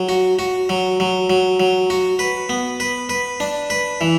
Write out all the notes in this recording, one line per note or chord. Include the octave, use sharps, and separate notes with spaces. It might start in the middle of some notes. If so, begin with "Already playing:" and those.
Already playing: F#3
F#4
F#4
F#3
F#3
F#3
F#3
F#4
B4
B3
B4
B4
D4
B4
E3